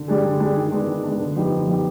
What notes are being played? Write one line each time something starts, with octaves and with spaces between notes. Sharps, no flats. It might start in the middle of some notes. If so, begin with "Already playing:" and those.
Already playing: D3
G3 D4 G#4
D3
G3 D4 G#4
D#3
G#3 B3 D4
D#3
G#3 B3 D4
D3
F3 B3 D#4 G4
D3
F3 B3 D#4 G4